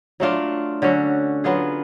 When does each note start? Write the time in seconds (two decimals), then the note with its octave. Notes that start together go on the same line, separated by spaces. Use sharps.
0.20 F#3 A3 D4 F4
0.82 D3 F#3 C#4 F#4
1.44 F#3 B3 F4 G#4